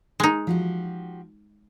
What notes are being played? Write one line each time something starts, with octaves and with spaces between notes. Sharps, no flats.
G#3 D#4
F3 F#4 G4